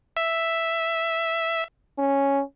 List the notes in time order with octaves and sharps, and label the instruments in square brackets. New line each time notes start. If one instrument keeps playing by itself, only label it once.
[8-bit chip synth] E5
[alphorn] C#4